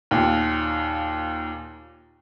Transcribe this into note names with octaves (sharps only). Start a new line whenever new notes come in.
D#2 A#2